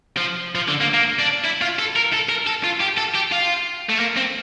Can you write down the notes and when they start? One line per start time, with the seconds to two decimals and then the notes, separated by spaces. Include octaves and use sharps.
0.17 F3
0.55 F3
0.68 D3
0.81 A#3
0.94 A#3
1.19 D4
1.45 E4
1.62 F4
1.79 A4
1.96 A#4
2.13 A4
2.29 A#4
2.47 A4
2.64 F4
2.80 G4
2.97 A4
3.15 G4
3.32 F4
3.90 A3
4.00 A#3
4.17 C4